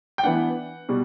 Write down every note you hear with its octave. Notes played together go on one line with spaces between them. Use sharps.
G5
E3 B3 D4 F#5
B2 G3